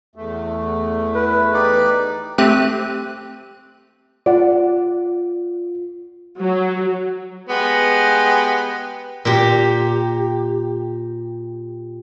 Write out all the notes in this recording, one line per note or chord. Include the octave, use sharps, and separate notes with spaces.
E2 A3
E4 B4
D#4 G4 D5
A3 C4 G4 F#6 D#7
F4 D5 F#5
F#3
G#3 B3 G4
A#2 G4